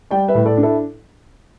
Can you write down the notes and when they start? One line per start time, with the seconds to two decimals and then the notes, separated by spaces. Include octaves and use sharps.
0.11 G3 D5 G5
0.28 B4 E5
0.35 A2
0.45 A4 D5
0.57 D4
0.63 E4 A4